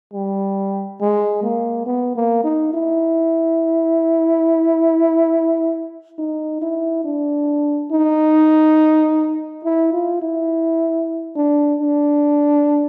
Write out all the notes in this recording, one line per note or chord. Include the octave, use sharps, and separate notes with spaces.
G3
G#3
A#3
B3
A#3
D#4
E4
D#4
E4
D4
D#4
E4
F4
E4
D4
D4